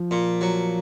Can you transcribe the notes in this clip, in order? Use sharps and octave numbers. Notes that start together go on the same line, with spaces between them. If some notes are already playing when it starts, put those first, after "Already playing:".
Already playing: F3
A#2
F#3